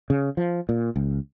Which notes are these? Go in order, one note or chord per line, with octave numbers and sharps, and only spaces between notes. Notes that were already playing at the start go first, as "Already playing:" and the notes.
C#3
F3
A#2
C#2